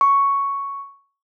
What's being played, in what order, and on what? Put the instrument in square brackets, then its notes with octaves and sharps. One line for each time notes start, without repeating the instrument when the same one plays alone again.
[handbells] C#6